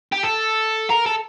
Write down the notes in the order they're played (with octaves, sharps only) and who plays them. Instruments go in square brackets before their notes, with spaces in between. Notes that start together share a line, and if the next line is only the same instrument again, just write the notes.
[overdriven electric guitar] G4
A4
A#4
A4